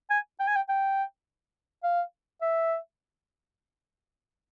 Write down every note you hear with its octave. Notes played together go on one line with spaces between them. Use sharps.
G#5
G5
G#5
G5
G5
F5
E5